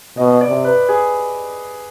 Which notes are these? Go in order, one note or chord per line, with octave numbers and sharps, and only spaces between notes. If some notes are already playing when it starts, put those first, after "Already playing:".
B2 D#5
D5
C3
B4
G#4